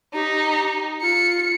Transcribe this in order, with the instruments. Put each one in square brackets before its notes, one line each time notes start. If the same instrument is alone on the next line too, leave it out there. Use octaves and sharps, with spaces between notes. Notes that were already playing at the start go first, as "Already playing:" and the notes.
[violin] D#4 [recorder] G4
[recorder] F4 [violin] C#7